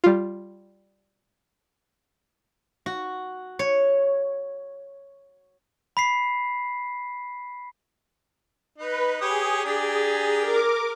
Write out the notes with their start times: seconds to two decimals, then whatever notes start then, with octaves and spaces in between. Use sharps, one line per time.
0.04 G3 F4
2.86 F#4
3.59 C#5
5.97 B5 B6 C7
8.78 D#4 B4
9.21 G4 G#4 C#5 D#6
9.65 D4 G4 A#5
10.40 A#4 D6